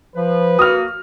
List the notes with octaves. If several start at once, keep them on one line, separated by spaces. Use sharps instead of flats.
F3 B4
A#3 F#4 D#6 F6